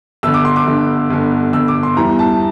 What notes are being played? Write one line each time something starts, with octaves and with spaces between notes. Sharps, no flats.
G1 G2 D3 E6
D6
C6
D6
G1 G2 D3
G1 G2 D3
G1 G2 D3 E6
D6
C6
E2 E3 G3 A#5
A5